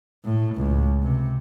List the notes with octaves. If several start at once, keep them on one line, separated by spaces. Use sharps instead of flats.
A2
C#2
C3